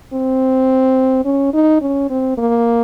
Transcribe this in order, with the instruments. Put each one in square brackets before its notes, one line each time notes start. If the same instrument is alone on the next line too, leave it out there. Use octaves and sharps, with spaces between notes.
[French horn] C4
C#4
D#4
C#4
C4
A#3